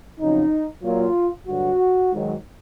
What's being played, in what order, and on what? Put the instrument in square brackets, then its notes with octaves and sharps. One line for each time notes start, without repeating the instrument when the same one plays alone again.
[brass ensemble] F2 C#3 F#3 D#4
A#2 F#3 F4
G2 D3 F#3 F#4
G#2 D#3 F#3